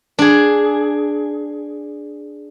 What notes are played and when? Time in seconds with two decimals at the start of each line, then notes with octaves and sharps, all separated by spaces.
0.19 D4 G#4